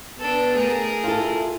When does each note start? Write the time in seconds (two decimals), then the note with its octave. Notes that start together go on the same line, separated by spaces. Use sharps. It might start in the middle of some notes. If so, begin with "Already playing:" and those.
0.19 B3 D4 A4
0.55 A3 G#4 A#4
1.04 E4 F4 A4